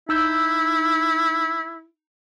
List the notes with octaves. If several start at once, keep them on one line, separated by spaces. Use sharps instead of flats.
D#4 E4 E6 G6